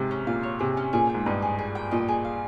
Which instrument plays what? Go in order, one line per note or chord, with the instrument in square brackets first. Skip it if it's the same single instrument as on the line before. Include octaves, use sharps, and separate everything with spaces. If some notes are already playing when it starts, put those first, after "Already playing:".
Already playing: [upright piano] G#2 C3
[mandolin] C#4
[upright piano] A#2 [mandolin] F5
[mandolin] C#5
[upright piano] C3 [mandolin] G#4
[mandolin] C#4
[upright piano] A#2 [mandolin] G#4
[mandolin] G5
[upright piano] G#2
[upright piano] G2 [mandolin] D#5
[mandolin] G#4
G#4
G5
[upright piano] A#2 [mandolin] D#5
[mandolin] G#4
F5